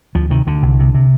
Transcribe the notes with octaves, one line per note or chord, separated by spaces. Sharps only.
D2 F3
C3 D#3
D2 D3
C2
C3
C3